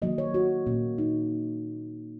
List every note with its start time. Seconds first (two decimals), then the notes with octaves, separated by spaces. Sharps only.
0.02 D#3 F#3 A#3 D#5
0.18 C#5
0.34 F#4
0.67 A#2 A#3 C#4
0.98 D#4